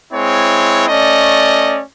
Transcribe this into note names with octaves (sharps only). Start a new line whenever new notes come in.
G#3 C4 E4 C#5
A3 C#4 D5 D#5